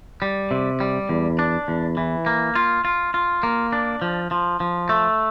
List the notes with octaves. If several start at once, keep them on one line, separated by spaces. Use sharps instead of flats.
G3
C3
G3
E2
D4
E2
E3
A#3
F4
F4
F4
A#3
D4
F3
F3
F3
A3